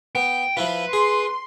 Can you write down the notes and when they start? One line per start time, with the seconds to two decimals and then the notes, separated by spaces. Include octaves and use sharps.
0.15 B3 G5
0.57 F3 E4 F4 B4
0.93 G#4 C6